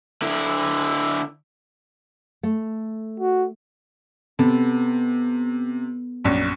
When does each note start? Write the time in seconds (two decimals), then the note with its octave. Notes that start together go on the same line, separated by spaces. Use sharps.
0.22 D3 E4
2.43 A3
3.20 F#4
4.39 C3 B3 A4 A5
6.24 A#1 F#2